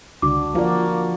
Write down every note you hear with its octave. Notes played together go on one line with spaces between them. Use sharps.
C#2 D3 D4 F#4 D6
F3 A#3 F#4 D5